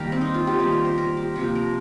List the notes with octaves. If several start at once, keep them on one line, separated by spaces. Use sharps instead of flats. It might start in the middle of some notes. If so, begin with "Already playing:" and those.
Already playing: D#3 G3 A#3 G4 A#4
C4
D#4
F4
G4
D#3 G3 A#3 G4
A#4
C5
A#4
G4
C3 F3 A#3 G4
A#4